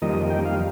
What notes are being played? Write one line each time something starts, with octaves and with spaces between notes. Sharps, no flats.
F2 D#3 G3 A#3 D#5
G5
F5